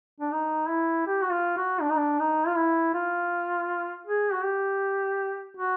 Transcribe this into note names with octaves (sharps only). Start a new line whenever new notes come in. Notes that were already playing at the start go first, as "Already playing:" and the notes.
D4
D#4
E4
G4
F#4
F4
F#4
D4
D#4
D4
D#4
F4
E4
F4
G#4
F#4
G4
F#4